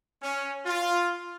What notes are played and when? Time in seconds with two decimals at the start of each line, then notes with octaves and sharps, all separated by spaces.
0.22 C#4
0.66 F4